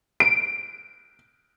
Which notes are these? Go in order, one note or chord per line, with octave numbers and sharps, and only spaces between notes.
D7